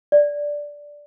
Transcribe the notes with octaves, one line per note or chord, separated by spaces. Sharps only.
D5